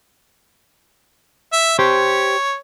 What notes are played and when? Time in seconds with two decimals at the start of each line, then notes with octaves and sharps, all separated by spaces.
1.53 E5
1.79 G4 C5 C#5